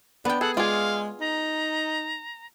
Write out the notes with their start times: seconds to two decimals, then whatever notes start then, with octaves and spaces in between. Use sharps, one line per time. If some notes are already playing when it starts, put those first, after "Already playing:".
0.25 B3 D4 G5
0.41 G#4 A4 F#5
0.57 G#3 F4 G#4 D5 F5
1.20 D#4 A#5